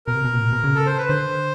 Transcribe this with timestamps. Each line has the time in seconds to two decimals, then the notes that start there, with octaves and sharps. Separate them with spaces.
0.07 B2 A#4
0.15 C3
0.25 B2
0.33 A#2
0.41 A2
0.52 B2
0.64 C#3
0.75 A4
0.86 C5
0.98 B4
1.09 D3 C5